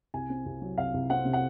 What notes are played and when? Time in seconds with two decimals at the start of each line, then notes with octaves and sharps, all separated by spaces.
0.14 C2 G#5
0.30 C4
0.46 C2
0.62 F#3
0.78 C2 F5
0.94 C2
1.10 C4 F#5
1.25 C3
1.33 F#5